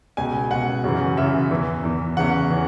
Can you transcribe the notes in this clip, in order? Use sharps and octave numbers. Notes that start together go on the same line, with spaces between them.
C#2 B2 G#5
C#2 B2 F#5
F#2 C#3 E3
F#2 C#3 E3 E5
E2 E3
E2 E3
E2 C#3 E3 F#5
C#3 E3